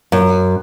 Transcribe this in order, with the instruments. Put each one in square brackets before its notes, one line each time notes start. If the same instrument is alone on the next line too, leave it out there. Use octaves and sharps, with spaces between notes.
[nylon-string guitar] F#2